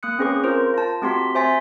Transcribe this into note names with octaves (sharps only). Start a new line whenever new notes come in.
A#3 D#6 F#6 C#7
C4 C#4 G#4 B4 C#6
F4 A#4 C5
F4 A5
A3 C4 F#4 G4 C6 B6
C5 E5 G#5 C6 A6 B6